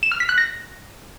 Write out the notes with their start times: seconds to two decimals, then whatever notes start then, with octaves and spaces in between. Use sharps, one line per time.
0.03 E7
0.12 F6
0.20 B6
0.29 F#6
0.38 A#6